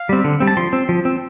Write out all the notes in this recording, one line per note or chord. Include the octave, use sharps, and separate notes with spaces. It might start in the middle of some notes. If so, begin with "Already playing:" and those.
Already playing: F5
G3 C4
D3
G3 C4
A5
F3 C6
C4
F3
C4